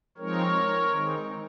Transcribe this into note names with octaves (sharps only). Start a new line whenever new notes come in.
F3 G#3 C4 D#4 A#4 C#5
D#3 G#3 C4 D#4